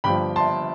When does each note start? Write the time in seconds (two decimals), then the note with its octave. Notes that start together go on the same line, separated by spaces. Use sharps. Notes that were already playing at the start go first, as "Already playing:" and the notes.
0.04 G1 G2 F3 G5 B5
0.36 A5 C6